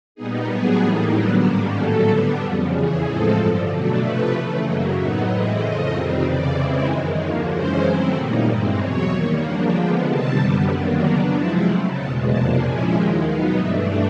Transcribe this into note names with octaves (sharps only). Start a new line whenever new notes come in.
A#2 G3 B3 D#4 G#4
A2 F#3 B3 D4 G#4
A2 E3 G3 A#3 D#4
D3 F#3 B3 D4 A4
G#2 D#3 G3 A#3 C#4 A#4
A2 F#3 A3 A4
D3 G3 B3 D4
F2 C#3 F3
E2 C#3 E3 G#4
A2 F3 G#3 C4 A4
G2 D3 F3
B2 F#3 A3 D4
C3 F3 A3 B4
C#3 E3 A3
F#2 C#3 F#3 A#3 D#5
A2 F#3 B3 D#4 E5
A2 E3 G#3 C4 E4 D#5
F2 C#3 F3 A3 D#5
F2 C3 D#3 G3 C4
F2 C#3 E3 D5
C#3 E3 G#3 C4 E4
F#2 D#3 G#3
D#2 D3 F3 A#3 C#5
F#2 C#3 E3 G#3 C#4 C5
D#3 F#3 A3 C4 E4
A#2 G3 A#3 D#4
G2 E3 G#3 C4
E2 B2 F#3 C#5
D#3 G3 A#3
C#3 F3 A#3 D4 F#5
D3 F3 G#3 B3 G5
C3 D#3 G3 C4 A5
F#2 D3 G3 B3
F#2 D#3 F#3 A#3 D4
C#3 F#3 B3 D4 A#5
C3 F3 G#3 C4 E4 A5
C#3 F#3 A3
E2 B2 G#3 A5
F2 C3 F3 A#3 D4 A5
A#2 F3 G#3 C#4 E4 G#5
D#2 D#3 G#3 G5
B2 F#3 B3 D#4 F5
G2 E3 A3 D4 E5